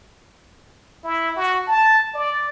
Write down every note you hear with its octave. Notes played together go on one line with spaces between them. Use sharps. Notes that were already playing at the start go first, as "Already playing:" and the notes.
E4
F#4
A5
D5